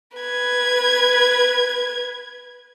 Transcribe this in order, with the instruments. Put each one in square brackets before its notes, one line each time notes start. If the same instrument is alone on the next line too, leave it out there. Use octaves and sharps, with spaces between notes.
[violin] B4 G#6